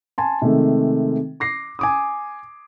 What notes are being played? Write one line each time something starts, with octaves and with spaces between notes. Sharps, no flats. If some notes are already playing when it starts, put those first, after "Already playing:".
G#5 A5 C6
C3 D#3 G#3 A3
D6 A#6 C7
G#5 D6 D#6